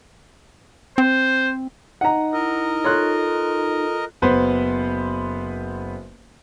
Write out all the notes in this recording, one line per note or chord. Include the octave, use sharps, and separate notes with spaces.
C4 C5
D#4 D#5 F#5 A#5
E4 A#4 D#5
F4 A4 C#5 C6 F#6
F#1 B3 B4 C5